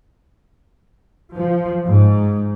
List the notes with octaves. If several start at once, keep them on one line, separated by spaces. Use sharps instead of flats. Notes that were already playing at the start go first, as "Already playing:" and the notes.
F3
G#2